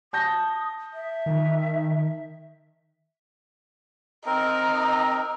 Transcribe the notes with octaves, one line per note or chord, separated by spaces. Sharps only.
A5 D#6 G6 A#6
E5
D#3
C4 D#4 A#4